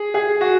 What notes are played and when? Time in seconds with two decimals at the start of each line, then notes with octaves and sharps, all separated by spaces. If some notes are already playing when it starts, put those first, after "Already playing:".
Already playing: G#4
0.14 G#4
0.41 F#4